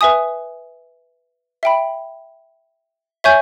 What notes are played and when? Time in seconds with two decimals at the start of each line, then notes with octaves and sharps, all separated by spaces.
0.01 B4 E5 G#5 D#6
1.63 E5 G5 B5
3.24 C#5 E5 G#5 C#6 G6